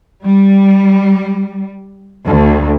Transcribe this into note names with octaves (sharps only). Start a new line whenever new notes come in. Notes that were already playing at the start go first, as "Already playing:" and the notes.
G3
D2